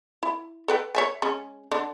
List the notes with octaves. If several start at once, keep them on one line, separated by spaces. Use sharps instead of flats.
E4
A4 B4 G5
C#5 E5 G#5
G#3 C#4
D3 D4